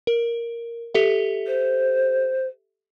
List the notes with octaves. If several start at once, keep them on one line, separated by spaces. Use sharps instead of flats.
A#4
G4 A4 E5
C5